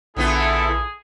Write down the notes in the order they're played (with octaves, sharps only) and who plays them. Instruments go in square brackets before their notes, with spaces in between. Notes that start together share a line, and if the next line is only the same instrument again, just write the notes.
[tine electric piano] A#1 [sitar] D3 B3 F4 [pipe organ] E4 A4 [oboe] G#4